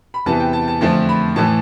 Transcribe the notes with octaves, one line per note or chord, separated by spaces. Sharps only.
B5
E2 C3 E3 B3 A5
G5
A5
A5
F2 D3 F3 A3 A5
B5
A2 E3 A3 A5